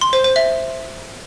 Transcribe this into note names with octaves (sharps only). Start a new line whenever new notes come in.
C6
C5
C5
E5